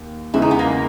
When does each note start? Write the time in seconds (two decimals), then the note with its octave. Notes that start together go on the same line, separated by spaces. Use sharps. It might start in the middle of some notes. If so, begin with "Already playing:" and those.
Already playing: D#2
0.34 E2 C#3 E3 G#3 E4
0.42 D#4
0.51 B3
0.59 A#3